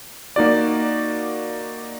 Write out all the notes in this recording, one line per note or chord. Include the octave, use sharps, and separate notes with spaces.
A#3 D#4 F#4 D5